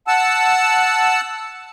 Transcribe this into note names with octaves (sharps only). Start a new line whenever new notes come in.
F#5 A5 E6